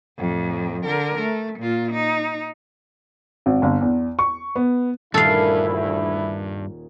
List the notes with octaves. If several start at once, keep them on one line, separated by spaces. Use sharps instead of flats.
F2 A2
D3 A#4
A3
A#2 F4
D#4
G#1
G1
E2
C#6
B3
D#1 D2 G2 C#4 E4 A4 A#4 F5